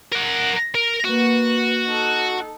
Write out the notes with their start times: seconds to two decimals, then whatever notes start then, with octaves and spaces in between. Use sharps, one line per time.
0.12 A#4 F#5
0.75 A#4
1.05 A#3 F#4 B4
1.86 D#4 A4